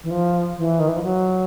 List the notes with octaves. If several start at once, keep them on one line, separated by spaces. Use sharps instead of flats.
E3
F3
E3
D#3
E3
F3
F#3